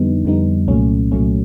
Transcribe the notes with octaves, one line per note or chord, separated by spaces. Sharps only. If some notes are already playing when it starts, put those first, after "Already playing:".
Already playing: F2 D3 G3 B3 D#4
F2 D3 G3 B3 D#4
C2 A#2 F#3 A3 C#4
C2 A#2 F#3 A3 C#4